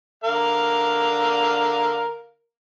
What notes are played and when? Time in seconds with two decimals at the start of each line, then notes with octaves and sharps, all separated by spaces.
0.24 D3 A#4 F5